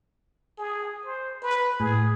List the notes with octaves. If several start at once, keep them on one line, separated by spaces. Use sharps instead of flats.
G#4
C5
B4
A2 G#4